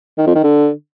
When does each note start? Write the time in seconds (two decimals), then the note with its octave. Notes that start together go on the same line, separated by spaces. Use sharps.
0.18 D#3
0.27 F2
0.35 D#3
0.44 D3